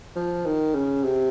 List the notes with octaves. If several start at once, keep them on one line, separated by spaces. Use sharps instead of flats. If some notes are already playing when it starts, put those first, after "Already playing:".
F3
D#3
C#3
C3